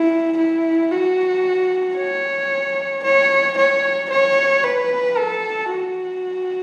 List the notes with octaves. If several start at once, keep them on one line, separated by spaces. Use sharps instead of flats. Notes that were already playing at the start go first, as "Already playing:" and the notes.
Already playing: E4
E4
F#4
C#5
C#5
C#5
C#5
B4
A4
F#4